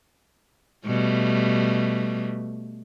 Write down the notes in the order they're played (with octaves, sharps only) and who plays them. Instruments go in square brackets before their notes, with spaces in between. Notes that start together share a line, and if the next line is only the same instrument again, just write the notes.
[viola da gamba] B2 G3 A3